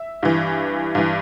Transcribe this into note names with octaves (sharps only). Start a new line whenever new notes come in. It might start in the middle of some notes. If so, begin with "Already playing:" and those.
Already playing: E5
G2 E3
G2 E3